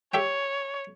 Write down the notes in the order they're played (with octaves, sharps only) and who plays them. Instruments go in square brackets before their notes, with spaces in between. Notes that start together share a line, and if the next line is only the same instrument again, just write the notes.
[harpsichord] G4 E5 G5 [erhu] C#5